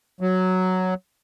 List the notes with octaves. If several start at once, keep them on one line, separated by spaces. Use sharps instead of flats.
F#3